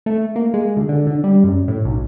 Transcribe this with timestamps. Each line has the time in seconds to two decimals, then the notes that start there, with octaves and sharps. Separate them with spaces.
0.06 A3
0.36 A#3
0.54 G#3
0.77 D2
0.89 D3
1.07 D3
1.24 G3
1.44 F#2
1.68 A2
1.85 B1